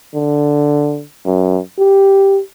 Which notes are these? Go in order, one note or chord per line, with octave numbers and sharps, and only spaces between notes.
D3
F#2
G4